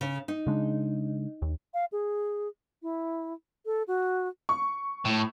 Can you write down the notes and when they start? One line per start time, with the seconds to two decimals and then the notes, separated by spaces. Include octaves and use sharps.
0.01 C#3
0.28 D#4
0.47 C#3 G#3 D4
1.42 D#2
1.74 F5
1.92 G#4
2.83 E4
3.66 A4
3.88 F#4
4.49 C#6
5.05 A2